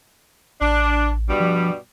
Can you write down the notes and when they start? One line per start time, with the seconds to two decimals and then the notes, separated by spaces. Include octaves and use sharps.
0.61 A1 D4
1.28 G2 B2 G3
1.40 F3